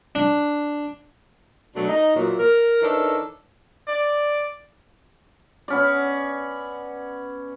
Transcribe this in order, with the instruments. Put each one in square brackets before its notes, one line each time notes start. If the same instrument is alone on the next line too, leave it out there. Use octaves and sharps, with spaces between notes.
[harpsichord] D4
[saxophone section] B2 F#3 A3 D4
D#4
A#2 E3 F#3
A#4
E3 D4 D#4 A4 A#4 C#5
[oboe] D5
[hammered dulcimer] B3 C#4 D5